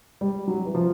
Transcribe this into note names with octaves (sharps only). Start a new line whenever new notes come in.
G3
F#3
E3
F3